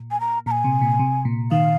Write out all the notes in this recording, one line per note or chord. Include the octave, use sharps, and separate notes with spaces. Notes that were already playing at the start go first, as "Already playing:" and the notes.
Already playing: A#2
G#5
A#5
A#2 A#5
G#5
C3
A#2
C3
A#2
D#3 F5